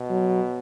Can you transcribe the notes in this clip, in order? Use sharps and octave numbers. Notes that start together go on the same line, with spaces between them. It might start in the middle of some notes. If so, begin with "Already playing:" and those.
Already playing: B2
F#3